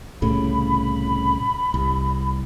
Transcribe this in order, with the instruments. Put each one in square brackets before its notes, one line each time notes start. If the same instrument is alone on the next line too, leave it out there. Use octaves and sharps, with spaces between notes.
[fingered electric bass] C2 A2 C#3 [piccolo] B5
[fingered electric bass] C2